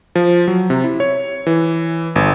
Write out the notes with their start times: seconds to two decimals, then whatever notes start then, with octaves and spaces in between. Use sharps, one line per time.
0.16 F3
0.48 F#3
0.70 C3
0.84 E4
1.00 C#5
1.47 E3
2.16 G1